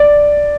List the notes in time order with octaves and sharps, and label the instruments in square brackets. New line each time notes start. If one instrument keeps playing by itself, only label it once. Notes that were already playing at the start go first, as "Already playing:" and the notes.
Already playing: [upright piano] D5